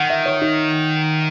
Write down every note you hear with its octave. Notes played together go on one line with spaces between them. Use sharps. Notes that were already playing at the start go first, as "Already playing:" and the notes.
Already playing: D#3 F#5
E5
C#5
D#4